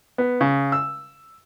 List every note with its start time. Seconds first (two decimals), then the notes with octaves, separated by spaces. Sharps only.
0.18 B3
0.41 C#3
0.72 E6